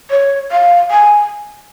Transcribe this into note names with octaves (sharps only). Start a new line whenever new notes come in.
C#5
F5
G#5